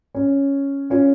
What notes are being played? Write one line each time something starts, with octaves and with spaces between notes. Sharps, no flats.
C#4
C#4 F4